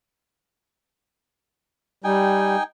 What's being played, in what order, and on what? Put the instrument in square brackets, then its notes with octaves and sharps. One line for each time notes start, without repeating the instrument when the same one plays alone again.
[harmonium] G3 [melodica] D#4 G5 G#5